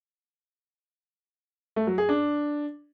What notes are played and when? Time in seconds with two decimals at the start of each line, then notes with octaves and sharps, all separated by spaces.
1.76 A3
1.87 F#3
1.98 G#4
2.09 D4